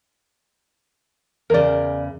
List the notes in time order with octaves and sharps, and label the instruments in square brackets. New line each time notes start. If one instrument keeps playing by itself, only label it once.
[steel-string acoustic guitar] E2 C#3 [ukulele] A#4 C5 D5